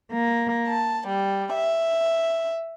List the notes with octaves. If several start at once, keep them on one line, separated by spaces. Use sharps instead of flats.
A#3
A5
G3
E5